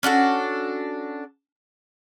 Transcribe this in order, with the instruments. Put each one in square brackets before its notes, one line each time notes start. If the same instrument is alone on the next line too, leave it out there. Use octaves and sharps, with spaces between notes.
[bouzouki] C#4 D4 F#4 A4